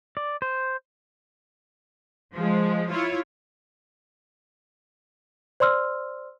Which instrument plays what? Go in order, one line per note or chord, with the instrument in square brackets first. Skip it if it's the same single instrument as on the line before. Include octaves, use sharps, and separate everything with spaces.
[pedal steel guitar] D5
C5
[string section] F3 G#3
E4 F4 C#5
[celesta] C5 D5 C6 E6 F6